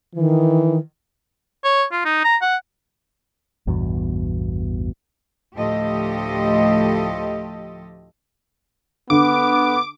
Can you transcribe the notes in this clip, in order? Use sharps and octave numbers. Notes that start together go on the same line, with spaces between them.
D#3 E3
C#5
F4
D#4
A#5
F#5
A1 E2 G2 B2
D2 A2 F3 G4 A4 D#5
D3 B3 D6